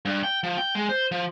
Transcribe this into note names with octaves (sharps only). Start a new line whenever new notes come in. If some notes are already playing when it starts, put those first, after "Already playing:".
G2
G5
F3
G5
G#3
C5
F3